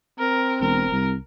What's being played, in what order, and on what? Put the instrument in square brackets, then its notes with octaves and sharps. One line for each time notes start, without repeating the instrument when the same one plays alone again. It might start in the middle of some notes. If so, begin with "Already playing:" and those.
[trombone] C4 [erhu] A#4
[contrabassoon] E1 [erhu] A#4
[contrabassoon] C2